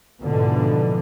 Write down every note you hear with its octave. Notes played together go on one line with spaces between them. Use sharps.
G#2 B2 D3 E3 F3